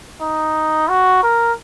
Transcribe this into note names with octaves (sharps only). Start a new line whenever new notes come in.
D#4
F#4
A#4